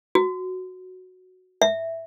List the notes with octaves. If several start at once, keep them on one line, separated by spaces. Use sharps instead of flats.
F#4
E5